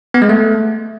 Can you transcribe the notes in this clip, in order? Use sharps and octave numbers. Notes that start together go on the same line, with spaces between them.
B3
G#3
A3